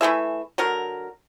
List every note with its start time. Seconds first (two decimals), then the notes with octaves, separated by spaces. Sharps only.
0.01 E3 A3 G#4 E5
0.58 D3 F#3 A#4